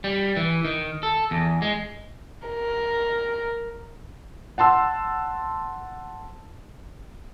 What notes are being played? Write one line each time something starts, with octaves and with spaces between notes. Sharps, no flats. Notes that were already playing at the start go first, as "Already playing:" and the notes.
G3
E3
D#3
A4
E2
G#3
A#4
F#5 A5 C6 E6